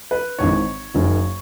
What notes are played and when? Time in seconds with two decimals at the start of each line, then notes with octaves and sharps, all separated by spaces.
0.11 B4
0.39 G#1 G#2 E3 C#5
0.94 F#1 F#2 D#3